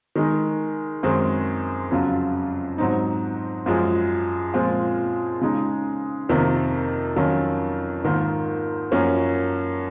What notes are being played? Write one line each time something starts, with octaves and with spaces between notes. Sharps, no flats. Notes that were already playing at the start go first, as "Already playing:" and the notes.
D#3 G#3 D#4
F#2 D#3 G#3 C4
F2 C#3 F#3 C#4 F4
G#2 F#3 C4 D#4
F#2 F3 G#3
A#2 F3 G#3 C4 F4
C#3 G#3 D#4
F2 C3 D#3 A#3 F4
F2 D#3 F#3 C#4 F4
G#2 D#3 A#3 F4
F#2 F3 A#3 C#4